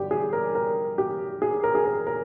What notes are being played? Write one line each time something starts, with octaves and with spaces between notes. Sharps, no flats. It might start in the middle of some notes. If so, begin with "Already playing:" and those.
Already playing: G2 D3 G4
G#4
A#4
A#4
G4
G#4
A#4
G#4
A#4
A#4